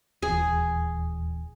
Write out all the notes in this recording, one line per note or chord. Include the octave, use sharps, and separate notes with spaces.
D#1 E2 G#4